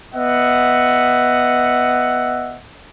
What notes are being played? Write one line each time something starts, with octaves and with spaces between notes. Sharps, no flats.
B3 D#5 E5 F#5